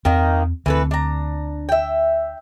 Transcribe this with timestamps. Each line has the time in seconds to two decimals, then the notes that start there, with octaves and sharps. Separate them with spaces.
0.05 E2 D#3 A#3 C4 D#4
0.66 D2 E3 C4 A4 B4
0.91 D4 A#5
1.69 E5 G5